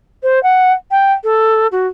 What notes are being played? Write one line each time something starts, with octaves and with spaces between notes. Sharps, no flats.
C5
F#5
G5
A4
F#4